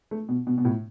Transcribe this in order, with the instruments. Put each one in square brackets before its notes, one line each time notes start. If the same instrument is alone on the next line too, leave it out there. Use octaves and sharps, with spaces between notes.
[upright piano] A3
B2
B2
B2
A2